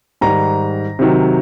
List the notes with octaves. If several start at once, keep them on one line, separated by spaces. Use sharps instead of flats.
G#2 D#3 G3 A#5
C3 D#3 F#3